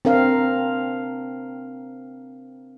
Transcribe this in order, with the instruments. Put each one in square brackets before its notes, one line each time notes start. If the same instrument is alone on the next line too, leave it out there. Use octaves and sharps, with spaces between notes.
[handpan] C4 D4 A#4 F5